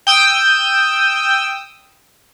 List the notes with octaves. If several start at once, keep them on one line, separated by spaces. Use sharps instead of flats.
G5 D#6 E6